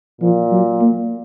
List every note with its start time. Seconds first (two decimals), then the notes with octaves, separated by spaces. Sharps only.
0.21 A#2 F3
0.51 F#3
0.81 A#3